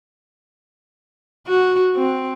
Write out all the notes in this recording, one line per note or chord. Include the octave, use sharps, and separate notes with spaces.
F#4
C4